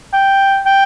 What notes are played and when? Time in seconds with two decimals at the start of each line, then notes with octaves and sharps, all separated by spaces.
0.13 G5
0.66 G5